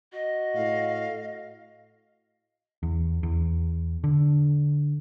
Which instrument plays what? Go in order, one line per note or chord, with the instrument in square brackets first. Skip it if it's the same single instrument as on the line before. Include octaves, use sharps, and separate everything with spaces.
[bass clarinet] F#4 [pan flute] D#5
[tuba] A2 [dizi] F5
[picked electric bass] E2
E2
D3